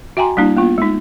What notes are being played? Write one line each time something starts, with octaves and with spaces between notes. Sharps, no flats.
F#4 E5 G5 G#5 A#5 C6
G3 A#3 D4 E4
A#3 B3 F4
G#3 D#4